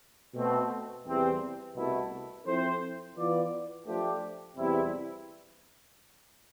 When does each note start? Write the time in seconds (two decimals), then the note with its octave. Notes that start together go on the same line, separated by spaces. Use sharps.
0.34 B2 A3 C4
1.05 E2 C3 E3 G3 C4
1.75 C2 B2 A3 E4 A4
2.45 F3 C4 E4 A4 C5
3.16 E3 B3 F4 B4 D5
3.86 F3 A3 D4 G4
4.56 E2 C3 G3 B3 E4